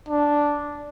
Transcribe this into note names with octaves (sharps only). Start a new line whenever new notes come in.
D4